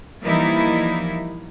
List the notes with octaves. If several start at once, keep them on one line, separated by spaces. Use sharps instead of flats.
E3 F3 G3 A#3 D#4 E4